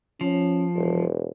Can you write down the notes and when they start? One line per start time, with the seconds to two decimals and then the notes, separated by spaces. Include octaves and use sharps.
0.21 F3 C#4
0.76 E1